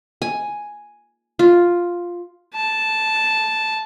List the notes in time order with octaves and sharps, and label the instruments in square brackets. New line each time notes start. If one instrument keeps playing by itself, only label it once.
[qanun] G#5
F4
[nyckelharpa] A5